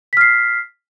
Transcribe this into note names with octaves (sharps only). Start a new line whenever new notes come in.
F6 B6 C7